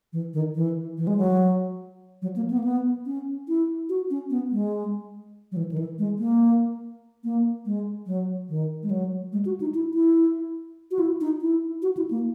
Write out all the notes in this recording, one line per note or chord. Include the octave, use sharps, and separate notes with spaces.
E3
D#3
E3
E3
G#3
F#3
F#3
A#3
B3
A#3
B3
C#4
E4
F#4
C#4
B3
G#3
F#3
E3
D#3
E3
G#3
A#3
A#3
G#3
F#3
D#3
G#3
F#3
G#3
F#4
D#4
E4
E4
F#4
E4
D#4
E4
F#4
E4
A#3